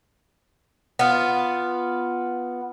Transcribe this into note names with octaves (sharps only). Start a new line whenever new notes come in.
B3 F4